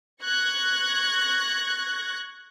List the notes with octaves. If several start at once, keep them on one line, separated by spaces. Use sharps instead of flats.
C#6 F#6 G#6 A#6